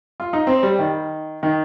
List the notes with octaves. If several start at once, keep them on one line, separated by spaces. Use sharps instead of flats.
F4
D#4
C4
G3
D#3
D#3